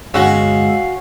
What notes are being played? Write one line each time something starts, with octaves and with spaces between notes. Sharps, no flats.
G1 G#3 C#4 F#4 F5 E6